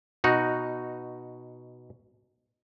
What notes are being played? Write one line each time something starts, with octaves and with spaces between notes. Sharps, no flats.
B2 D#4 F#4